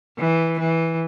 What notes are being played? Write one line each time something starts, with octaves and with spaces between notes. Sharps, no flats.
E3
E3